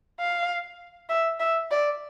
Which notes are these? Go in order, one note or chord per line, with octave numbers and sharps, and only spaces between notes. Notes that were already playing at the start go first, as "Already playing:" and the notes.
F5
E5
E5
D5